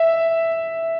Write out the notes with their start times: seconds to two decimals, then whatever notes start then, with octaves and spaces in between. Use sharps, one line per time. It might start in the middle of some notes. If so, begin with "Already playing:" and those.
Already playing: E5